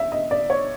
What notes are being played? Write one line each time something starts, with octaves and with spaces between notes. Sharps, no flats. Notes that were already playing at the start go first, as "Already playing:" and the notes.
Already playing: E5
D#5
D5
C#5